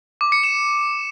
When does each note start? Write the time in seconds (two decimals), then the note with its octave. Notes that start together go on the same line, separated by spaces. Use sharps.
0.21 D6
0.32 C#7
0.43 E7